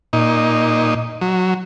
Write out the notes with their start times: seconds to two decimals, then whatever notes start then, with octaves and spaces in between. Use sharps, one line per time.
0.13 A#2 D#4
1.21 F#3